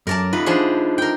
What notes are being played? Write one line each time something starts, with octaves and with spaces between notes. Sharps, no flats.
F#2 A#4 D5 A5
D#4 F4 B4
F3 D4 G#4
A#4 G5